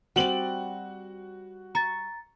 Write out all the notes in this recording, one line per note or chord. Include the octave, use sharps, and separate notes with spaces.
G3 C4 F#4 D5 F#7
A#5 C#6 A6